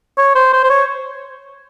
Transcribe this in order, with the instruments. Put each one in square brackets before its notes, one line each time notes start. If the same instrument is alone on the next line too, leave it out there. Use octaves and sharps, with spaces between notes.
[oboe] C#5
C5
C5
C5
C#5